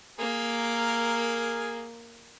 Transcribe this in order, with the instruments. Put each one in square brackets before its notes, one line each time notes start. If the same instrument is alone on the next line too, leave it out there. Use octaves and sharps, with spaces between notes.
[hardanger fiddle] A#3 [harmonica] G#4 A#4